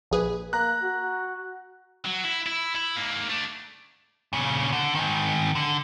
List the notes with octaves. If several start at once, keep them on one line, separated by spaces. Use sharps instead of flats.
A#1 G#4 B4
A#3 A#5 F#6
F#4
F#3
E4
E4
E4
G#2 A#3
A3 D4
A#2 C#3
D3
G#2 D#3
D3